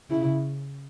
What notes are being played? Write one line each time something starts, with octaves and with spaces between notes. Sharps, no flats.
C#3 E4